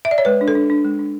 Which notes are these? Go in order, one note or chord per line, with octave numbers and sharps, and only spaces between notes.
E5
D5
C#5
G#3 B4
D4
A4
D4
D4
G#3
D4